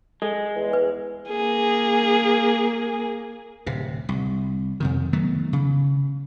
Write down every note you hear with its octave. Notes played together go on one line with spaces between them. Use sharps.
G#3 A4
E2
B4
A#3 G#4
D1 C3
C2
F2 C3 D#3
D#3 F#3 A3 B3
C#3